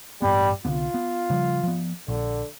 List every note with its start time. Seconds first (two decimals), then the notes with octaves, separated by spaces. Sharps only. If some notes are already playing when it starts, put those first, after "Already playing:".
0.22 A1 G2 G3 B3
0.65 C2 D3 B3 F4
0.94 B3
1.30 C#3 F3 G3
1.64 F3 B3
2.08 A#1 D3